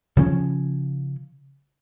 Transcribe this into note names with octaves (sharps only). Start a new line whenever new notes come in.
C#3 F3 C4 C#4